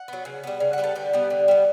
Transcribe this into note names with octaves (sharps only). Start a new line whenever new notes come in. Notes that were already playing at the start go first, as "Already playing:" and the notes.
Already playing: F#5
F#3 B3
C#3
G3 B3
C#3
F#5
G3 B3 B4
A4
D3 G4
G3 B3
D3
G3 B3